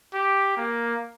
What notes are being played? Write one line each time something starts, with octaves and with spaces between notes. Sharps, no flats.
G4
A#3